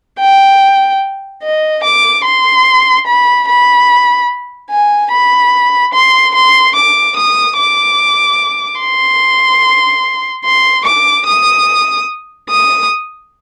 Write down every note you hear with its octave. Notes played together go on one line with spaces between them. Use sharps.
G5
D#5
D6
C6
B5
B5
G#5
B5
C6
C6
D6
D#6
D6
C6
C6
D6
D#6
D#6